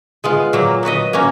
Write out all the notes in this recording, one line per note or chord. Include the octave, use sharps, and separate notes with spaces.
G#3 B3 F4
A#2 F#3 A#3
B3 F#4 B4 D#5
A#3 C#4 F#4